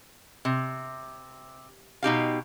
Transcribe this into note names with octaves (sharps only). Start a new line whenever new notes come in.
C3
B2 D#4 G4 F5